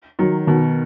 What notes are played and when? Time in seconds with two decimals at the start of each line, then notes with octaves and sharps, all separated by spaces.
0.19 D#3 F#3
0.47 B2 D#3